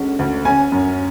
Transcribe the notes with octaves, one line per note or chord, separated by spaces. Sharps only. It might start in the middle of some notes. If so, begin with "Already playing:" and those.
Already playing: D2 D3 G#3 C#4
D2
C#4 G#5
F#2